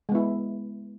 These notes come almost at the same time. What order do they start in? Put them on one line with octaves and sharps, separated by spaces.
G#3 B3 E4